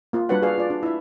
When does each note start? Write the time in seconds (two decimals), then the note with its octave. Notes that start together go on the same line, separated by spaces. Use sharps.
0.13 A#3 F4
0.29 G3 D4 F#4 B4 C#5 F#5
0.42 F#4 G#4 B4 D5 F5
0.58 F4 D5
0.70 D4
0.83 E4 E5